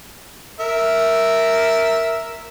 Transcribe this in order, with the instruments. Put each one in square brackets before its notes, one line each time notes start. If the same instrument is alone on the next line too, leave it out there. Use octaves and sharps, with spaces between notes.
[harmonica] A#4 E5